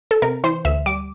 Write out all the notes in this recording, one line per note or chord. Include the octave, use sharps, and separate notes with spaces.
A4
C3 A#4
E3 C5
D2 E5
G3 D6